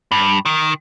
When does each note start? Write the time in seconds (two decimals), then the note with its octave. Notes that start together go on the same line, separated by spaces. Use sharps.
0.12 G2
0.45 D#3